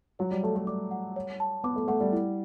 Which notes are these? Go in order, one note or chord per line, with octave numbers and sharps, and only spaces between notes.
F#3 C#5
G3
A3 A5
A3
G3 D6
F#5
C#5
A5
B3 D6
A3
A3 F#5
G3
E4